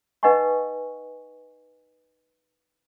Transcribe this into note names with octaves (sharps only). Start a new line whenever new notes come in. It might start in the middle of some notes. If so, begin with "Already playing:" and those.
D#4 B4 D#5 F#5 G#5 C#6